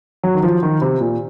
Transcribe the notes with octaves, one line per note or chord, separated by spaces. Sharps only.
F#3
D#3
F3
D#3
C3
A#2